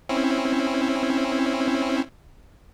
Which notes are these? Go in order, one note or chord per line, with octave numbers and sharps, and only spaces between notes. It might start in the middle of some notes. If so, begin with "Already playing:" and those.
C4 C#4 E4